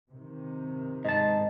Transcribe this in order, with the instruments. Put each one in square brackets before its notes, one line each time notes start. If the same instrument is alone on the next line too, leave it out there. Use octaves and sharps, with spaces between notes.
[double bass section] C3 D#3
[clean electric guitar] G#2 A5 [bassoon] D#4